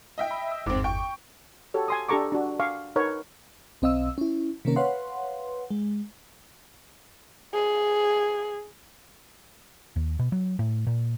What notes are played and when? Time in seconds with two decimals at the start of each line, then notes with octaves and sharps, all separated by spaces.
0.18 D#5 E5 G5
0.31 B5
0.51 E6
0.66 G1 E2 G#2 C4 D6
0.84 G5 C#6
1.74 F#4 G4 A4 C#5
1.88 G#5 C6 D#6
2.09 D4 G4 A4 A#5 C#6 D6
2.32 D4 F#4
2.60 F5 G#5 C#6 D6
2.96 D#4 A#4 B4 C#5
3.82 B1 C4 D#5 F5 E6
4.18 C#4 E4
4.65 C3 D#3 A#3 C#4 A#4
4.76 B4 C#5 F5 F#5 C6
5.70 G#3
7.54 G#4
9.96 D#2
10.19 B2
10.32 F#3
10.59 A2
10.87 A#2